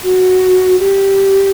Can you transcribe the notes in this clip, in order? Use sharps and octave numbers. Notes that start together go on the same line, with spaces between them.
F#4
G4